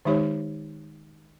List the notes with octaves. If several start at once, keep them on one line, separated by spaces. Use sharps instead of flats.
D#3 G#3 D#4 G4 C#5